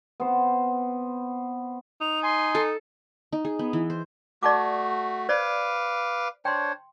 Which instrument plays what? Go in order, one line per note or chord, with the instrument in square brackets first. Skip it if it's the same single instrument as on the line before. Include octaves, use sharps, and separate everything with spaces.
[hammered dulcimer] B3 C4 C5
[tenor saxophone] D#4 [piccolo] F7
[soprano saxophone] G#5 [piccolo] C6
[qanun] A4
D#4
G#4
B3
E3
C5
[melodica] A3 F#4 [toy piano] D5 A5 D6
[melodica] B4 F5 D6 [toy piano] C5 D5
[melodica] D4 C5 C#5 [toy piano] G5 C6